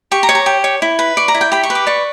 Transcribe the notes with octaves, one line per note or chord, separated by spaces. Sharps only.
G4 C#6
A#5
C#5
A#5
G4
C#5
E4
B4
D5 C#6
A#5
E4
G5
G4 B5
C#6
B4
D6
D5 C#6